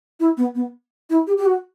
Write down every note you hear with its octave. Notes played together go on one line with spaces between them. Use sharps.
E4
B3
B3
E4
G4
G4
F#4